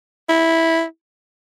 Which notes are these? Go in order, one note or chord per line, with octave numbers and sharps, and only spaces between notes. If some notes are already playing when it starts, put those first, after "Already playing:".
E4